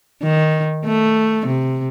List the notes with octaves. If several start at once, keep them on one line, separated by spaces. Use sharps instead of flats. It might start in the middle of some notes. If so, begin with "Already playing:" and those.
D#3
A3
C3